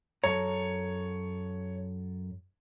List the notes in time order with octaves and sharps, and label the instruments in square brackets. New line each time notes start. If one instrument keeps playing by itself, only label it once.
[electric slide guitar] F#2 A4 A#5 [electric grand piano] C#5